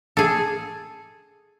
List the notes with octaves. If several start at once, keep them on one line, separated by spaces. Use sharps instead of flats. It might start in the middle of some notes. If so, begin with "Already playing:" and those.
G#4 A4